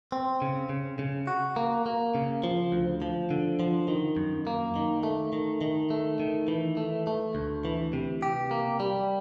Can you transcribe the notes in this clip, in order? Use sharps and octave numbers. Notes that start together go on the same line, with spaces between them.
C4
C#3
C#3
C#3
F#4
A#3
A#3
C#3
F3
D2
F3
D3
F3
D#3
F#2
A#3
D#3
A3
D#3
D#3
A3
D#3
E3
A3
A3
D2
E3
C3
G4
A#3
G3